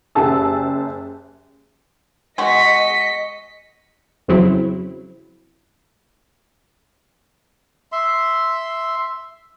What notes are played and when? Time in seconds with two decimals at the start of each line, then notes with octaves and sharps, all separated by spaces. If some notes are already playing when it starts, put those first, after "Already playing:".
0.15 F#1 F#2 G4 G#4 A5 E6
2.38 G#3 F#4 D#5 B6 C#7
4.28 F2 C#3 F#3 C4 E4
7.92 E5 C6